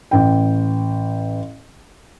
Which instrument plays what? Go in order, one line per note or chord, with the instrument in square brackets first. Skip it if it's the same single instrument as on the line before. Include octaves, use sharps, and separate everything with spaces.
[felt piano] A1 G5